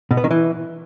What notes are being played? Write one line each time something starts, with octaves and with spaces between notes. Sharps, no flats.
B2
B3
D#3
E3